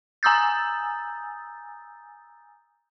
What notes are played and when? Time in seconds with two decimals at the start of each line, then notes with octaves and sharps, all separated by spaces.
0.23 G#5 A#5 D#6 E6 G6 A6